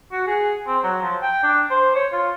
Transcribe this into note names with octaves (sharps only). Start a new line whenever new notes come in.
F#4
G#4
C4
F#3
F3
G5
D4
C5
C#5
F4